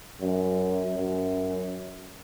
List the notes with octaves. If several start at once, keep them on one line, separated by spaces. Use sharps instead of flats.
F#2
F#2